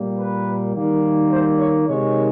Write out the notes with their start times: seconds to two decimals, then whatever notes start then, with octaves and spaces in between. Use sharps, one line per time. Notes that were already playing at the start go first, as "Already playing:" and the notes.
Already playing: A#2 G3 A#3
0.16 B4
0.73 D#3 G3 A#3
1.29 C5
1.58 C#5
1.86 C3 D#3 G#3 C#5